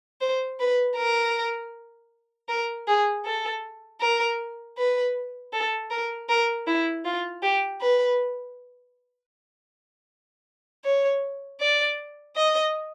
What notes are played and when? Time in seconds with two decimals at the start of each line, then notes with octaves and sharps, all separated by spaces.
0.21 C5
0.60 B4
0.97 A#4
2.49 A#4
2.87 G#4
3.25 A4
4.00 A#4
4.78 B4
5.53 A4
5.90 A#4
6.29 A#4
6.67 E4
7.05 F4
7.43 G4
7.81 B4
10.84 C#5
11.61 D5
12.36 D#5